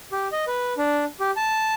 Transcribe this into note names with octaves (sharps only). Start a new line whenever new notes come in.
G4
D#5
B4
D4
G4
A5